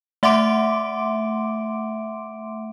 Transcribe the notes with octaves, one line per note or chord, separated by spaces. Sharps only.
A3 E5 F#5 C6 D6 D7